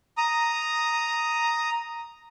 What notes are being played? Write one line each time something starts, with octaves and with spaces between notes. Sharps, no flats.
A#5 D#6